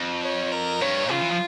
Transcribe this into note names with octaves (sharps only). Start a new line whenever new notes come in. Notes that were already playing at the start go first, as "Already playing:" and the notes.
Already playing: F2
C#5
A#4
G2 C#5
C#3 F4
E3
F3